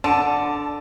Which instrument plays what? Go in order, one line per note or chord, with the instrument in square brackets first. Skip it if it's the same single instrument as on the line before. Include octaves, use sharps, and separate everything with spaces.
[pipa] D3 [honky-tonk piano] A5